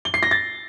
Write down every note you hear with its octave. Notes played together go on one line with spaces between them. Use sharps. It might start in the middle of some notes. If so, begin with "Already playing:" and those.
G7
C7
A#6
A6